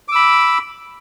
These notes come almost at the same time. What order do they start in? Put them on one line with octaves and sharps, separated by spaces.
D6 E6 B5